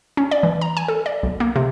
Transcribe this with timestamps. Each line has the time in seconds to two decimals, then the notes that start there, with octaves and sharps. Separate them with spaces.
0.17 C#4
0.31 D5
0.43 E3
0.61 A#5
0.77 G#5
0.88 A4
1.06 D5
1.23 B1
1.40 A#3
1.56 C3